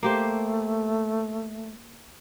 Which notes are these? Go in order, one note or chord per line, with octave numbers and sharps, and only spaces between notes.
A3 A#3 G4 C5